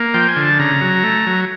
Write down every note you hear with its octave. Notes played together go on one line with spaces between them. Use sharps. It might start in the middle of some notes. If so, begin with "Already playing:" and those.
Already playing: A#3
F3 G5
G#5
D3
A5
C#3 A#5
F#3
A3
F#3